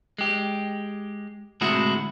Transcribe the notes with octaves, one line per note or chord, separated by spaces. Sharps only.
G#3 G4
D2 A2 C3 G#3 E4 F#4